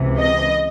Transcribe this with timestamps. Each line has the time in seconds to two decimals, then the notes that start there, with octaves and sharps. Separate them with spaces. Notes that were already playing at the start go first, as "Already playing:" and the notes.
Already playing: C#2 C3 E3
0.19 D#5